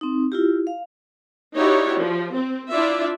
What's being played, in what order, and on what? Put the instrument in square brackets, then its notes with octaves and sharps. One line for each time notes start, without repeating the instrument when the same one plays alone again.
[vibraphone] C4 D#4
E4 F4 G4
F5
[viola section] D#4 E4 F#4 G4 C#5 D5
F3
C4
D4 E4 F4 D5 E5